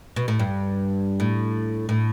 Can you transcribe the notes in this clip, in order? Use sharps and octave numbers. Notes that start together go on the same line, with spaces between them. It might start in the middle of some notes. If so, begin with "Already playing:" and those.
B2
A2
G2
A2
A2